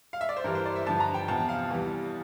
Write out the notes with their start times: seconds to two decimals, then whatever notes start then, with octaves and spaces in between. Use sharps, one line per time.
0.13 F5
0.21 E5
0.29 D5
0.37 C5
0.44 G2 E3 G3 A#4
0.55 C5
0.65 D5
0.76 E5
0.86 G2 D3 F3 A5
1.00 A#5
1.14 G5
1.28 E2 C3 F3 A5
1.49 F5
1.70 E2 E3 G3